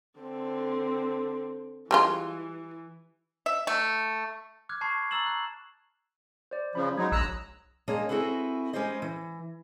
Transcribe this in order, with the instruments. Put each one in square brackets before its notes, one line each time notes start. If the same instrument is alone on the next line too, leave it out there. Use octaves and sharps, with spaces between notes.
[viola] D3 C4
[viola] E3 [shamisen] G3 G#3 F4
[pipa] E5
A3
[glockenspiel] D6 F6 F#6 G#6
A5 B5 C#6 G#6 C7
A#5 C#6 E6 A6 E7 F#7
F#6
[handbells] C5 D5
[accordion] C#3 F3 [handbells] B5
[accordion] F#3 G#3 D#4 [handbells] C#5 D#6 G#6
[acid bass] A#1 [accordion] A#5 E6 F#6
[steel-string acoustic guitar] G#3 A#3 D4 G#4 C#5 D#5
C4 E4 F#4 G#4 A4 B4
G#3 C#4 G4 B4 C5 D#5
E3